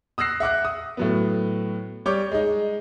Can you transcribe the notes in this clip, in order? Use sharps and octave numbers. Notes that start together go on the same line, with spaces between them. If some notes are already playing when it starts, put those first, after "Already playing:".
D#6 E6 F#6 A#6 C7
E5 F#5 D6 F#6
D#6
A2 F#3 B3
G3 C#5 C#6 D6 G6
G#3 D#4